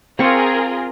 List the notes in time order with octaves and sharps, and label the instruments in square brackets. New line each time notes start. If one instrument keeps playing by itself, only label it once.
[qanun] C4 C#6 [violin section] F4 G#4 A#4